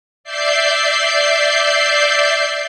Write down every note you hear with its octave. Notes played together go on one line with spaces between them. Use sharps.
D5 E5 G6 C7